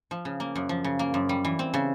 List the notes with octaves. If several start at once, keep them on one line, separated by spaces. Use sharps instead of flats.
F3
C#3
A#3
F#2
F3
C#3
A#3
F#2
G3
E3
C4
C#3